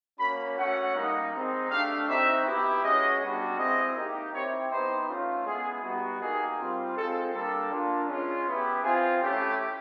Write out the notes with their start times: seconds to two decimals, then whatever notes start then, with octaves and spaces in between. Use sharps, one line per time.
0.19 A#3 C#4 F#4 B5
0.56 A3 C#4 F#4 F#5
0.95 G3 A#3 D#4
1.33 G#3 C4 D#4
1.69 A3 D4 G4 F5
2.07 C4 D#4 F#4 E5
2.45 B3 E4 G4
2.83 G#3 C#4 F#4 D#5
3.20 G3 B3 D4 F#4
3.57 G#3 C4 E4 G4 D#5
3.95 A#3 D#4 G4
4.32 C4 E4 G4 C#5
4.70 B3 D#4 G4 C5
5.08 A3 C#4 F4
5.45 G#3 B3 E4 G#4
5.82 G3 B3 D#4 F#4
6.20 A#3 D#4 G4 G#4
6.58 G3 C4 F4
6.95 G#3 C4 F4 A4
7.33 G3 A#3 D4 G4 A4
7.70 A#3 D4 F4
8.08 G#3 C#4 F4
8.46 B3 E4 G4
8.83 C4 F4 G#4
9.20 A3 C#4 E4 G4